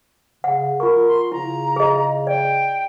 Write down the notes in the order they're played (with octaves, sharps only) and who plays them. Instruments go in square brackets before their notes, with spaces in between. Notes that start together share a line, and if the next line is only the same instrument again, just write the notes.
[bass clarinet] C#3 [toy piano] F#5
[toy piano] F4 C#6 [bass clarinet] A#4
[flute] C6
[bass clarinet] C#3 [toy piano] E4 [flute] A#5
[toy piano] G#4 D#5
[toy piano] D5 [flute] G5